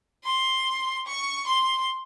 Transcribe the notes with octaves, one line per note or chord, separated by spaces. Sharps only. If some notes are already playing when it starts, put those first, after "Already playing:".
C6
C#6
C6